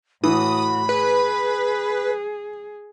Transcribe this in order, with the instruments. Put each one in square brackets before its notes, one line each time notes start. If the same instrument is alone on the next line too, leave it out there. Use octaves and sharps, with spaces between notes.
[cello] A2 F#4 [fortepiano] E3 [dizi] B5 [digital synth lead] D#6
[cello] G#4 [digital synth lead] B4